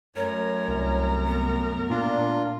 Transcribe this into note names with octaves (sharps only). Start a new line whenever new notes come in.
F#2 A3 A#4 C#5
C2
B3
A#2 D4 F4